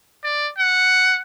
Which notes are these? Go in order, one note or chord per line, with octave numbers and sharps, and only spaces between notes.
D5
F#5